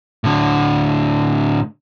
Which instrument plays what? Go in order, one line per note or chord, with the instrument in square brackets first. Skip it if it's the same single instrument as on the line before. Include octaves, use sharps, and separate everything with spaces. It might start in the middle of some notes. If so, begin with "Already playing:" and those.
[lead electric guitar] A2 D3